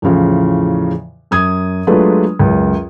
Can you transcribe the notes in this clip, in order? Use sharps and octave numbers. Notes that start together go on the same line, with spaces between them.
E2 A2 C#3 F3
F#2 D#6 G#6
F#3 G#3 A3 D4 F4 B4
C#2 F#2